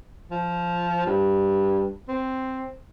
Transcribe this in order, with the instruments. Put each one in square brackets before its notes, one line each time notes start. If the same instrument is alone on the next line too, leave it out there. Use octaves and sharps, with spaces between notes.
[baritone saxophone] F3
G2
C4